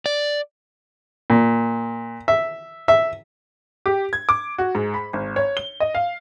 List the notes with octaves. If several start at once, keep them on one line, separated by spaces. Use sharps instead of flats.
D5
A#2
E5
E5
G4
G#6
D6
F#4
G#2
B5
G#1
C#5
G7
D#5
F5